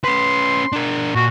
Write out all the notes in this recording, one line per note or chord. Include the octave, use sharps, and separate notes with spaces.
C#4 B4 C6
D4 A#4
A#2 F#4